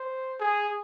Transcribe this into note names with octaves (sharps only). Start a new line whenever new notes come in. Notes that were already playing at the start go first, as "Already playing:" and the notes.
Already playing: C5
G#4